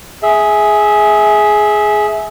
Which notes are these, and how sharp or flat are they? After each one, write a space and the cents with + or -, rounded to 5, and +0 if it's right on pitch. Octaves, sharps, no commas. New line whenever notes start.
G#4 +10 E5 -15